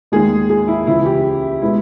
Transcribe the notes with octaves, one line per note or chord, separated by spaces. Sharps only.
D#2 D#3 G#3 G#4
G#4
E4
C#2 C#3 E3 E4
G4
B2 G#3 B3 E4